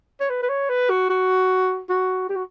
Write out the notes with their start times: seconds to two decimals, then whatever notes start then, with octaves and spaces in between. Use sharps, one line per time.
0.20 C#5
0.30 B4
0.42 B4
0.49 C#5
0.69 B4
0.90 F#4
1.10 F#4
1.89 F#4
2.29 G4
2.36 F#4